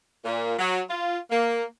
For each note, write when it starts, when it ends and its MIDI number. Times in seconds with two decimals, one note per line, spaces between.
0.24 0.54 46
0.59 0.80 54
0.90 1.17 65
1.31 1.63 58